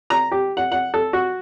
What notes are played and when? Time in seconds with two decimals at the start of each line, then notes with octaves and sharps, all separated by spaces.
0.10 A#5
0.31 G4
0.57 F#5
0.72 F#5
0.94 A4
1.13 F#4